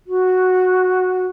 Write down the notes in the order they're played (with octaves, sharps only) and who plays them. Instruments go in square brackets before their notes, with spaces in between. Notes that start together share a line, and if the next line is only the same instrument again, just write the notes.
[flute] F#4